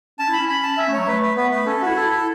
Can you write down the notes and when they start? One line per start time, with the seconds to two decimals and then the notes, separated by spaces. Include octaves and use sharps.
0.19 C#4 A5
0.29 E4
0.33 B5
0.39 C#4
0.48 B5
0.63 A5
0.77 C#4 E5
0.88 A3
0.93 C#5
0.98 F#3
1.08 A3 B4
1.22 B4
1.37 B3 B4
1.51 A3 B4
1.66 C#4 A4
1.82 E4 F#4
1.96 E4 A4
2.10 E4